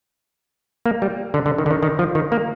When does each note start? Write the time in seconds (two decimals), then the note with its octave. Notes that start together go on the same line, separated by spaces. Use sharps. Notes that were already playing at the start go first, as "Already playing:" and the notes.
0.86 A#3
1.02 G3
1.34 D3
1.46 D3
1.58 D#3
1.66 D3
1.71 D#3
1.83 D#3
1.99 F3
2.15 D#3
2.32 A#3